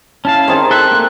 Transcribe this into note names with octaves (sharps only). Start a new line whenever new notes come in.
C#4 E4 F5 A5
D#3 C4 G#4
A4 C5 E5 F#6
A3 A#3